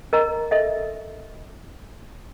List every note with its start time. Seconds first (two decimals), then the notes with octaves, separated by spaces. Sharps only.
0.13 A#4 D#5 A#5
0.51 A4 D#5 E5